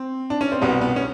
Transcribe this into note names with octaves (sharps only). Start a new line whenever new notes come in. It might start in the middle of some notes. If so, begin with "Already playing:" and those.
Already playing: C4
D4
C#4
C4
C2 B2 G3 B3
B3
C#4